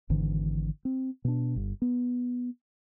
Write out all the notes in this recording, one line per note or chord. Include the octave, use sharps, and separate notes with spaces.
G#1 G#2 D3 E3
C4
B2 D4
G1
B3